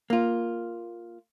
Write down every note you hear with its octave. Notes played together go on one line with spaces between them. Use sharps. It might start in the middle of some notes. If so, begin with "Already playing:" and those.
A#3 F4